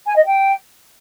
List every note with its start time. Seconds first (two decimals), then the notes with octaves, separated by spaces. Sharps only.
0.06 G#5
0.16 D#5
0.26 G5